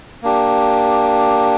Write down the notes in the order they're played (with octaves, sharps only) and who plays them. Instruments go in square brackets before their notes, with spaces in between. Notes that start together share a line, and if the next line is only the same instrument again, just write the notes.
[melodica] A#3 D4 G4